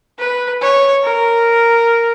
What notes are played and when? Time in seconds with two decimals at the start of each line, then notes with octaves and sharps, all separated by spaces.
0.19 B4
0.61 C#5
1.04 A#4